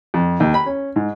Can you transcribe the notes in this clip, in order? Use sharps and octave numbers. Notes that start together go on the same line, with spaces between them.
F2
D#2
B5
C#4
G#2